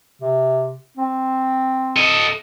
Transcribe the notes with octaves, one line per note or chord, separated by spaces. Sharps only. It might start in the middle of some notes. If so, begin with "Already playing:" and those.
C3
C4
A4 D#5